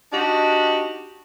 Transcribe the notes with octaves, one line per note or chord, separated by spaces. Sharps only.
D4 D#4 F#4 G4